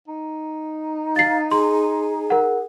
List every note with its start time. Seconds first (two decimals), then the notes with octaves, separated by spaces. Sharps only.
0.08 D#4
1.16 F5 A6 C7
1.51 G#4 C6
2.30 A#4 F#5